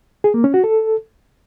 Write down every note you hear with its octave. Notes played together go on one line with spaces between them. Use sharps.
G#4
A#3
C#4
F#4
A4